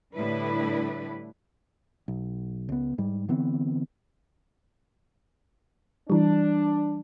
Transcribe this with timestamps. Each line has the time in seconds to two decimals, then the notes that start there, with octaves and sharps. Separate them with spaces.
0.15 A2 D3 G3 D4 E4 B4
2.08 B1
2.69 C#2 B3
2.98 G#2 G3
3.29 D3 E3 B3 C4
6.10 E3 G3 D4